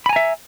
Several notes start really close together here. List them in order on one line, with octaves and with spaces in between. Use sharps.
B5 G#5 A#5 E5